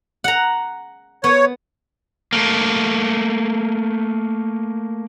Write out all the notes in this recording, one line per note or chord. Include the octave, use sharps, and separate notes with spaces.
F#5 A#5
B3 C#5
A3 A#3